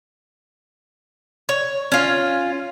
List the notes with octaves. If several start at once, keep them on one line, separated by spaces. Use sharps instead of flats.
C#5
C#4 F4